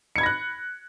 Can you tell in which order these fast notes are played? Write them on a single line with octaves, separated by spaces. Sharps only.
C#7 G#6 B5 A#6 F#6